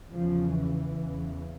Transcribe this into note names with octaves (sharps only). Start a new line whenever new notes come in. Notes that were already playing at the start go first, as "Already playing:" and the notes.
E2 C#3 F3
E3
E2 C#3